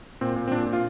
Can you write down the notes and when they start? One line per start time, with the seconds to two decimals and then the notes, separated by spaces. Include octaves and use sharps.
0.21 A#2 C4
0.36 A#2
0.48 C4
0.51 A#2 D4
0.66 A#2
0.73 F4